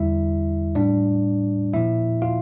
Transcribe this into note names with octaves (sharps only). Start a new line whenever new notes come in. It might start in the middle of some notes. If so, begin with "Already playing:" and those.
Already playing: E2 D3 G3 E4 E5
A2 G3 D4 D5
A#2 F3 E4 E5
F4 F5